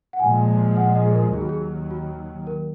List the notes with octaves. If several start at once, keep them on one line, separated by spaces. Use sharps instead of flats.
F#5
A#2 F3 G#3 G#5
F#5
D#5
G#4
A#4
D#2 D#3 F#3 G#4
F#4
G#4
F#4
A#4